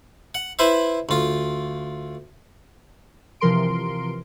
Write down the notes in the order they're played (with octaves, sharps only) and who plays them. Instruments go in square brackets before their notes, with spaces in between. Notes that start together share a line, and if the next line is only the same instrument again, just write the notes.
[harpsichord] F#5
E4 B4 C5 E5
D2 F4
[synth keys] C3 E3 F3 A#4 C6 D7